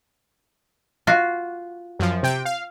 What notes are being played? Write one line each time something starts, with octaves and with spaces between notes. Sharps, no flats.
F4 F#4
F#2 F3
C3 G5
F5